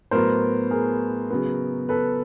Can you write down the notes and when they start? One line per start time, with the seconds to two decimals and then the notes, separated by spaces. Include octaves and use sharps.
0.11 A2 F#3 B3 A#4 C5
0.71 G#4 A#4
1.31 C#3 F#3 B3
1.89 A4 B4